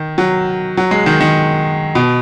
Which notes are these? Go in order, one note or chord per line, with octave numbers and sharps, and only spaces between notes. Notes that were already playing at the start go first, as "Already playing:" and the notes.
Already playing: D#3
F#3
F#3
G#3
D#3
D#3
B2